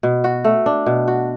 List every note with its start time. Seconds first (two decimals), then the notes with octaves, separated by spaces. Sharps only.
0.03 B2
0.24 F#4
0.44 A3
0.66 D4
0.86 B2
1.08 F#4